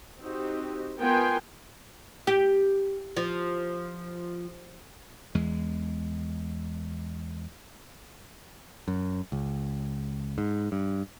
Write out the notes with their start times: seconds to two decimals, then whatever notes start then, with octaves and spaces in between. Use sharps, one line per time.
0.20 C4 D#4 F#4 G4
0.99 B3 F4 A#4 G5 G#5 C6
2.27 G4
3.17 F3
5.35 E2 G#3
8.88 F#2
9.32 C#2
10.38 G#2
10.72 G2